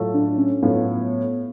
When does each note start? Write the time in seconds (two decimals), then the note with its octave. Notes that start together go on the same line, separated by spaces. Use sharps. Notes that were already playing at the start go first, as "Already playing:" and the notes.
Already playing: A2 F#3 A3 F4
0.14 D4
0.38 C#4
0.63 A2 F#3 A3 B3 F4